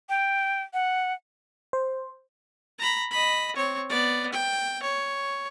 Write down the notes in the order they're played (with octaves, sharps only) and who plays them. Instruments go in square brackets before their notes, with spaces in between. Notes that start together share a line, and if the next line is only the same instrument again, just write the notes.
[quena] G5
F#5
[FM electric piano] C5
[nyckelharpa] A#5 B5
D#5 B5
C4 C#5
B3 D5
G5
C#5